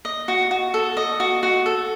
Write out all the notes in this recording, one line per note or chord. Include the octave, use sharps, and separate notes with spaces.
D#5
F#4
F#4
A4
D#5
F#4
F#4
A4